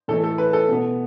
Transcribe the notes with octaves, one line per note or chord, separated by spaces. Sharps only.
A2 E3 A3 A4
A4
B4
A4
B2 B3